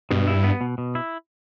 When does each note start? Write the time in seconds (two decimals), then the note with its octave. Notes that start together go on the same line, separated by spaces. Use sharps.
0.11 G2 B2
0.27 E4
0.44 B3
0.61 B2
0.78 B2
0.95 E4